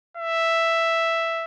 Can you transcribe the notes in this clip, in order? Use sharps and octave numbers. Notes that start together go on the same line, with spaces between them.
E5